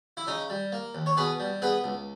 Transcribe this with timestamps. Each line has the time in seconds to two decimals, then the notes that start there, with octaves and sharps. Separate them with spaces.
0.17 E4
0.27 C#3 D#4
0.50 G3
0.72 A#3
0.95 D#2
1.06 C#5
1.17 B2 G#4 B4
1.40 G3
1.62 B3 G#4 B4
1.84 C#2